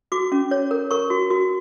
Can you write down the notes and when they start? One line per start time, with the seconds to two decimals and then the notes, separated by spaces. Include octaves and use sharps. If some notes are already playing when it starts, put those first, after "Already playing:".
0.12 F#4 D6
0.32 C#4
0.51 C#5
0.71 A#4
0.91 A#4 C#6
1.10 F#4
1.30 F#4